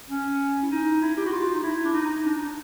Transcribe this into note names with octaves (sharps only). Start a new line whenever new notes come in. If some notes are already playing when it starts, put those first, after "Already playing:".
C#4
E4
D#4
E4
G4
F#4
F4
D#4
E4
D4
D#4
D4